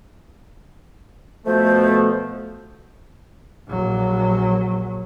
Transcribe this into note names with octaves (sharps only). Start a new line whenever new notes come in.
B2 F3 A3 C5
A#1 F#3